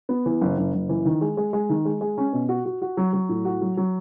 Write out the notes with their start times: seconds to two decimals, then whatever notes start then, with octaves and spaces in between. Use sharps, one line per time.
0.09 B3
0.26 E3
0.41 F#1
0.58 F#1
0.74 F#1
0.89 E3
1.05 D#3
1.21 G#3
1.37 G#3
1.53 G#3
1.69 D#3
1.85 G#3
2.01 G#3
2.18 C#4
2.33 B2
2.49 F#4
2.65 F#4
2.82 F#4
2.97 F#3
3.13 F#3
3.29 A2
3.45 F#4
3.61 F#3
3.77 F#3